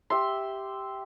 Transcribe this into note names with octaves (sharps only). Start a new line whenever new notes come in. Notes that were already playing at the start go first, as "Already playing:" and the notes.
G4 E5 C6